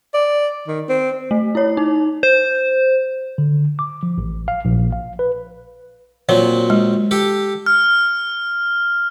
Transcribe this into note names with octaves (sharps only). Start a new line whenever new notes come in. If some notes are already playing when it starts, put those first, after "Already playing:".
D5
D#3
C4
A3
E4 C#5
D#4
C5
D3
D6
F3
A1
F5
A#1
F5
B4
A#2 F#3 C4 C#5
G#3
G4 A4
F6